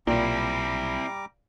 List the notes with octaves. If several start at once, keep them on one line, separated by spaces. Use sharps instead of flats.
B1 A#2 G3 C4 E4 A#5 D6